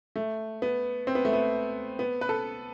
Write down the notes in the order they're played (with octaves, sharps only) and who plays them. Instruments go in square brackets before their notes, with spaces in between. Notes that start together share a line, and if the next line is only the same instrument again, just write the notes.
[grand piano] A3
B3
C4
B3
A3
B3
B3
B4
A4